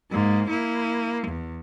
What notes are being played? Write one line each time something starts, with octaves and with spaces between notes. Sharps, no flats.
G#2 A#3
A#3 E4
E2